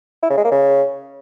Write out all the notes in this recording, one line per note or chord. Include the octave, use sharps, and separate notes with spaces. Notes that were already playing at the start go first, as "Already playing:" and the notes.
E4
C#3
G#3
A#3
C#3